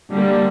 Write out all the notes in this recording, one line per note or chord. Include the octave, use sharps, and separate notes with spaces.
D3 G3 A#3